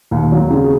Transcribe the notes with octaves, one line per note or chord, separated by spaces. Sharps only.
D#2
F#3
C#3